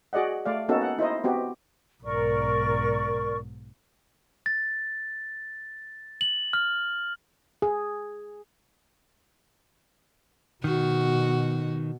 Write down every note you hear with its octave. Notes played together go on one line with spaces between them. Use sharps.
F#4 G#4 D5 D#5 F#5
A3 D5 F5
A#3 B3 C#4 D#4 F#4 A4
F#5
D#4 E4 C5 D#5
B3 C4 F#4 G4
B1 G#2 A#4 D5 C#6
A6
F#7
F6
G#4
B2 D#3 F#4